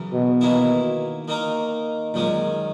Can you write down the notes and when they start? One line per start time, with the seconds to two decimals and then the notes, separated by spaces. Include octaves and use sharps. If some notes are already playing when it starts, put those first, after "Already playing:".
Already playing: F#2 C#3 E3
0.13 B2
0.41 D#3 A#3 E4 G#4
1.28 D#3 A#3 D#4 A#4
2.13 F#2 A#2 D#3 G#3 C#4